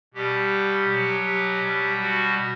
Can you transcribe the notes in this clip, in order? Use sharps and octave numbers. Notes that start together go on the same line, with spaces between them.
B2 G3 G4
B2 F#3
G4
B2 G3
F#4